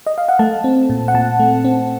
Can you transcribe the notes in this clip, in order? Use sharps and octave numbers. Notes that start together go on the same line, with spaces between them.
D#5
F5
F#5
A3 A5
C4
A#2
F#5
A#2 A5
A3
C4